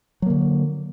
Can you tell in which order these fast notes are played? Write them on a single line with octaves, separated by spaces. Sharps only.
F#3 A#3 D3